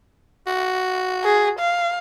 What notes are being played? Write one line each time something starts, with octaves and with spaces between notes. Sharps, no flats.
F#4
G#4
F5